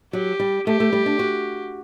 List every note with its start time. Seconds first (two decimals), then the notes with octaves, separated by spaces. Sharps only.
0.13 F#3 G4
0.40 G3
0.67 A3 G4
0.80 A3
0.93 G3
1.06 D4
1.19 F#4